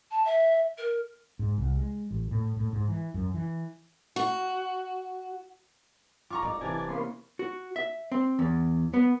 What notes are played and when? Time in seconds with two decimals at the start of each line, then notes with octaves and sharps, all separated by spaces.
0.11 A5
0.25 E5
0.78 A#4
1.39 G#2
1.58 C2
1.77 G#3
2.11 A1
2.31 A2
2.57 A2
2.73 G#2
2.88 E3
3.14 F#2
3.34 E3
4.16 F#4
6.30 F4 A#5 C#6 D6
6.43 D1 D#4 D5
6.61 C3 E3 D5 G#5 A5
6.89 A#3 B3 C#4 C6
7.39 F#4
7.76 E5
8.12 C4
8.39 E2
8.94 B3